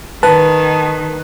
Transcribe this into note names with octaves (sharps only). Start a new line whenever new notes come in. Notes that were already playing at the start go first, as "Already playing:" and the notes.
D#3 B4 A5